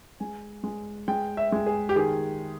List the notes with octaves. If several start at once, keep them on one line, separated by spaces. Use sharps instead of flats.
G#3 G#5
G#3
G#3 G5
E5
G#3
G#4
G4
D#3 G#4